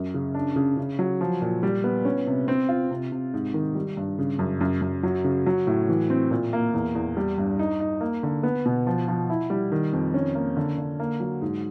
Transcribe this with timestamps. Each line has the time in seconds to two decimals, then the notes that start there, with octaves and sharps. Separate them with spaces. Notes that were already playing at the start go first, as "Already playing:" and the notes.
Already playing: F#2
0.14 C#3
0.35 D4
0.56 C#3
0.77 C#3
0.99 F#3
1.21 F3
1.42 A#2
1.63 G3
1.84 B3
2.05 C#4
2.27 C3
2.48 C4
2.69 F4
2.91 C3
3.12 C3
3.34 G#2
3.54 D#3
3.75 G3
3.97 G2
4.19 C#3
4.39 F#2
4.61 F#2
4.81 F#2
5.03 F#3
5.24 C#3
5.46 F#3
5.67 A2
5.89 E3
6.10 C4
6.31 A#2
6.53 A#3
6.74 E2
6.95 E2
7.17 G3
7.38 G2
7.59 D#4
7.80 D#4
8.01 A#3
8.23 D3
8.43 B3
8.66 B2
8.87 F3
9.08 F3
9.30 E4
9.50 G3
9.72 D#3
9.93 F2
10.14 C#4
10.35 A#3
10.57 D3
10.78 D3
11.00 A#3
11.20 F#3
11.42 G#2